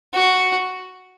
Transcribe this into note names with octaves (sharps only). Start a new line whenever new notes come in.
F#4